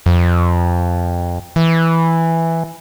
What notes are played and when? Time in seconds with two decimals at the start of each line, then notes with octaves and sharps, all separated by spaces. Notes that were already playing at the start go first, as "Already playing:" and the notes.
0.06 F2
1.56 E3